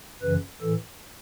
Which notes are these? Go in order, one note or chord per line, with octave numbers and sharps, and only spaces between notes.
F#2 C#3 E3 B4
A2 E3 A4